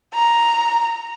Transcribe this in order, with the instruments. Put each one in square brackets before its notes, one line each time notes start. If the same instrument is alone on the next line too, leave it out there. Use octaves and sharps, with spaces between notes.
[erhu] A#5